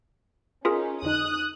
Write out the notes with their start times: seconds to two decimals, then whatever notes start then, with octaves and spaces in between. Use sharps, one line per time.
0.65 C#4 D#4 F4 G#4 A#4
1.02 F2 D3 D#4 D#6 F#6